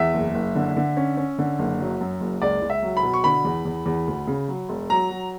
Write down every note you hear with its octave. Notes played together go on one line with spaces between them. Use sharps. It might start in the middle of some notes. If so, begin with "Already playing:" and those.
Already playing: E2 E5
F#1
F#1
D3
D3
C#4
C#4
D3
F#1
F#3
F#2
F#1
C#2 D5
C#2
E5
F#3
B5
B2
C#6
D3 B5
E2
E2
E2
D2
C#3
F#3
E1
F#3 A#5
F#3